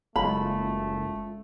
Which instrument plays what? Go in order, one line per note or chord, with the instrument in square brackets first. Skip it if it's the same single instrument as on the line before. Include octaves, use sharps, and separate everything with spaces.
[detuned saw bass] F#1 [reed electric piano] G#3 C#4 F4 [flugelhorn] A3 [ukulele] B5